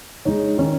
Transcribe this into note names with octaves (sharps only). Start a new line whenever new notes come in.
G#3 D#4 C#5
D#3 C#4